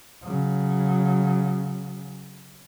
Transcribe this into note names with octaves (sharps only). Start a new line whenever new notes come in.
C#3 F#3